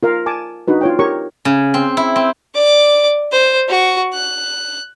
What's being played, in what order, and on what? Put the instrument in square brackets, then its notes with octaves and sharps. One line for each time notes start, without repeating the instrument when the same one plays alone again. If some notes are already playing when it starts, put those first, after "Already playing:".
[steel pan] F4 A#4 F5
G#5 A5 D6
D4 D#4 F#4 B4
F4 C#5 G5
G4 A#4 C#5 C#6
[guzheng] C#3
C4
E4
C4
[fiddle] D5 D6
C5
F#4 C#6
F#6